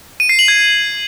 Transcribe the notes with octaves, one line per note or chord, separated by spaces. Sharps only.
D#7
C7
F#7
G#6